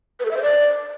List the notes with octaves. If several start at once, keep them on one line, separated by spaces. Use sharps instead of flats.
B4
A4
E5
C5
D5